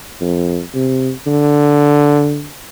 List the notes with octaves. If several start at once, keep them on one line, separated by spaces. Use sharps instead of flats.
F2
C3
D3